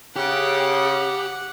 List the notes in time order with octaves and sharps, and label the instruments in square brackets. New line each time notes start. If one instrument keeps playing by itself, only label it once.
[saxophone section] C#3 [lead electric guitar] G4 [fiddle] F#5